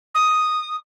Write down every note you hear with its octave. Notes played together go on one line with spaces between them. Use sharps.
D#6